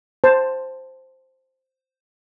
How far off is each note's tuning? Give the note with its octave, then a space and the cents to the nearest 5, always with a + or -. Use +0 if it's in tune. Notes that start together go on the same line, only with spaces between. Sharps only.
C5 +0 A5 +0